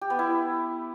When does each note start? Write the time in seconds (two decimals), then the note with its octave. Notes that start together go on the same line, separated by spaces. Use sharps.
0.01 G4
0.10 B3
0.19 E4